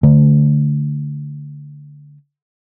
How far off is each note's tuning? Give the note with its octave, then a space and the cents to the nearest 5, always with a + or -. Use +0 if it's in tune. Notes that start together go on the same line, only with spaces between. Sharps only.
D3 -10 A3 +0